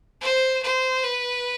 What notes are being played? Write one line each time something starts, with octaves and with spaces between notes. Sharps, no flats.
C5
C5
B4